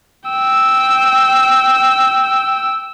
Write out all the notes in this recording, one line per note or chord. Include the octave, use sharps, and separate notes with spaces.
G5 E6